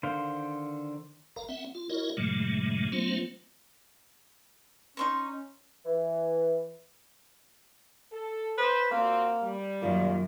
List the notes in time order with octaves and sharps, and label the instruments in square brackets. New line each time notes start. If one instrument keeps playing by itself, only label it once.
[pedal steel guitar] D3 D#3 C5 F5
[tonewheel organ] F#1 A#4 F5 A#5
C4 E5 F#5
F4
E4 F#4 A#4 C#5 D#5
G2 A#2 C#3 F#3 G#3 A3
F#3 A3 B3 C#4 F4 C5
[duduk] C#4 [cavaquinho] D#4 C6 C#6
[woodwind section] E3
[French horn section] A4
[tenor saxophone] B4 [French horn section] C5
[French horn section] A#2 C4 F#4 [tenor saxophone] A#3
[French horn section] G3
[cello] F#2 D#3 [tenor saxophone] A#2